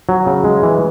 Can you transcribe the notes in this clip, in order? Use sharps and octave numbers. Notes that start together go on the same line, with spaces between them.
F#3
C#3
G#3
E3